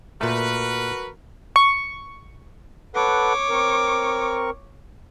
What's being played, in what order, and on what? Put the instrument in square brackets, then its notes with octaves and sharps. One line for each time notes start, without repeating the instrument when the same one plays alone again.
[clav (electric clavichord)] A#2 A3 [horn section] F#4 A#4 B4
[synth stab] C#6
[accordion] A4 B4 F#5 [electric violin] C#5 D6
[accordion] C4 A#4 C#6